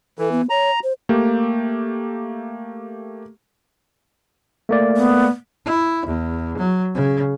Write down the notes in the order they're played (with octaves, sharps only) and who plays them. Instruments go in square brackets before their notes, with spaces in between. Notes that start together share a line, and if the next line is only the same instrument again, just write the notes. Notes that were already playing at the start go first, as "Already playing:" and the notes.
[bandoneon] E3 [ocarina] A4
[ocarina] B3
[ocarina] C#5 [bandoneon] A#5
[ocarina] C5
[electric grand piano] A3 A#3 G4
[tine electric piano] A3 A#3 D5
[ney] B3
[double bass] E4
E2
F#3
C#3